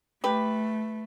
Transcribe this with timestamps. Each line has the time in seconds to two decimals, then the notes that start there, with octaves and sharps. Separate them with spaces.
0.24 A3 G4 B4